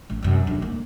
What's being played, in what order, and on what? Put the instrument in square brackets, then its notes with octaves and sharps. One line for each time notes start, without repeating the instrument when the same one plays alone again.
[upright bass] A1
F#2 C3
D#2 D3
A#3